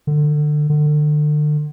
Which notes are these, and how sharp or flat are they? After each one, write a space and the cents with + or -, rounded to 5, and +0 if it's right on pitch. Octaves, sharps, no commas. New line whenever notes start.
D3 +25
D3 +35